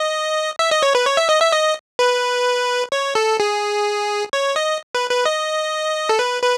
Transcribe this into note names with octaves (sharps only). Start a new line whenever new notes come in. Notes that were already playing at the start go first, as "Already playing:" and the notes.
Already playing: D#5
E5
D#5
C#5
B4
C#5
E5
D#5
E5
D#5
B4
C#5
A4
G#4
C#5
D#5
B4
B4
D#5
A4
B4
B4